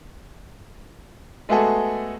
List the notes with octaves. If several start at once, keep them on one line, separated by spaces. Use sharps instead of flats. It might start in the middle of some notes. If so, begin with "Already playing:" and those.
G#3 A3 B3 F#4 G#4 A4